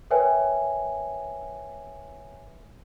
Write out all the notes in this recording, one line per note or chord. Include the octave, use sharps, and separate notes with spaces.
A#4 B4 C#5 E5 G5 G#5